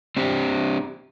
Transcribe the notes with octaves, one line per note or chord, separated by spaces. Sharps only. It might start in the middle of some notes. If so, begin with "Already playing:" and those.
C4 D4 G4